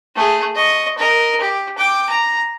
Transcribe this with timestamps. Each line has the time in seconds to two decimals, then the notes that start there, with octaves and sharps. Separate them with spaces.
0.16 A3 G#4
0.55 D#5 C#6
0.98 A#4 D#5
1.41 G4
1.78 G5 D6
2.09 A#5